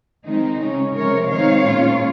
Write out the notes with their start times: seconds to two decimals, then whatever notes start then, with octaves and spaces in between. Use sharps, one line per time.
0.25 D#3 G#3 C4 D#4
0.60 C#3 G#3 C#4
0.94 C3 F3 G#3 A#4 C#5
1.30 D#3 G#3 C4 D#4 C#5 F5
1.65 A#2 G#3 C#4 F4